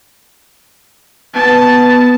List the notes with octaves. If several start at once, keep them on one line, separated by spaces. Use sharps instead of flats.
B3 A5 D#6